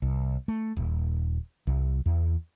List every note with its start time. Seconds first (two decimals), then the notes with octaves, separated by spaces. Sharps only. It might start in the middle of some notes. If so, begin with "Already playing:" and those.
0.02 C2
0.48 A3
0.77 D#1
1.67 C2
2.06 E2